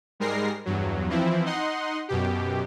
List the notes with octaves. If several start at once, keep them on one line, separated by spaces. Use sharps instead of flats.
G#2 G3 G#3 A#4 A#6 C7
E2 G2 F#3
E3 F3 C4 E4
D#4 D#5 F#5 C6
F#2 B2 G4